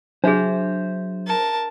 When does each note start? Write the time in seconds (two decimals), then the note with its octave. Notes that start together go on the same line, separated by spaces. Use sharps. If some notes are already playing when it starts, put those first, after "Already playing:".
0.24 F#3 D4 G#4 C5 E5
1.27 A#4 A5